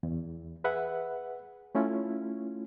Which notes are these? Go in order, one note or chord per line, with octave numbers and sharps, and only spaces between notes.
E2
G#4 B4 E5 F#5
A3 C#4 E4 F4